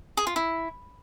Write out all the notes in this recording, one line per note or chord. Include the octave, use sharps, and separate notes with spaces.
G#4
F4
E4